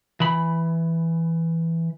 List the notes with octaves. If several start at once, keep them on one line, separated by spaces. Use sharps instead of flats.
E3 B5